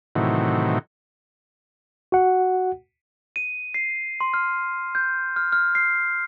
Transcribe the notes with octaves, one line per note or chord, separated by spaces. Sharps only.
A2 C3 D#3 E3 F#3
F#4 F#5
D#7
C7
C6
F6
G6
F6
F6
C7